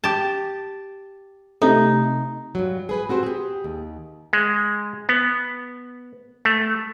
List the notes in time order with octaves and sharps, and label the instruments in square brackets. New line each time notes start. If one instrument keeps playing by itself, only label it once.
[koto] G4 A5
[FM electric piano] C3 A3 [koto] D#4
[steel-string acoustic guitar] G2 F#3
G#4 B4 G#5
C4 F#4 G4 C5
G4 G#4
D#2
[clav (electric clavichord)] G#3
B3
A3